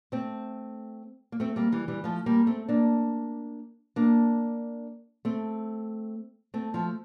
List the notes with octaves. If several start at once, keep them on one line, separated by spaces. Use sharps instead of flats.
A3 C4
A#3
A3 C4
G3 A#3
E3 G3
E3 G3
F3 A3
G3 A#3
A3 C4
A#3 D4
A#3 D4
A3 C4
A3 C4
F3 A3